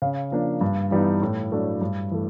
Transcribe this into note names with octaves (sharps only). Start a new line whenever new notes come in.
C#3 F5
F3 A#3 D4
G2
E3 G3 B3 D#4
A2
F#3 A3 D4
G2
E3 A3